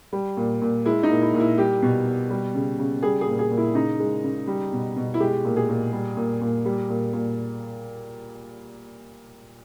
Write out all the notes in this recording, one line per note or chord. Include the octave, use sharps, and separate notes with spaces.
G3
A#2
A#2
G#3 E4
D#4
A#2
E4
A#2
E4
G3 G4
B2
B2
G3
C#3
C#3
G3 G#4
G#4
A#2
G#4
A#2
E4
C#3 D#4
G#3
C#3
G3
B2
B2
E4
G#3 G4
A#2
G#4
A#2
G3
A#2
A#2
G3
A#2
A#2